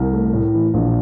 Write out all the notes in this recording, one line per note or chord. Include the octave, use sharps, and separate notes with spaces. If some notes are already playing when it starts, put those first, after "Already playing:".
Already playing: C2 A#4
A3
A2
E3
A#1